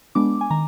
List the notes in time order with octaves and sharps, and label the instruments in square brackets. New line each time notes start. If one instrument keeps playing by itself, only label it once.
[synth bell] G#3 B3 D4 D6
G#5
D#3 A#5